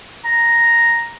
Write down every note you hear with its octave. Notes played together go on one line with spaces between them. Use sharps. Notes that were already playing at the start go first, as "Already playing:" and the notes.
A#5